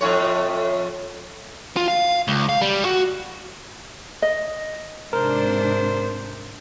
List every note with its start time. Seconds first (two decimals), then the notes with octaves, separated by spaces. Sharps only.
0.01 F2 A2 C#5
1.77 F4
1.88 F5
2.28 C#2
2.49 F5
2.61 G3
2.85 F#4
4.22 D#5
5.13 G#2 C3 D4 A#4 C5